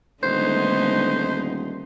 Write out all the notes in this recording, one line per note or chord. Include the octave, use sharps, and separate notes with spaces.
D#1 D3 G#3 A3 B3 D#4 C5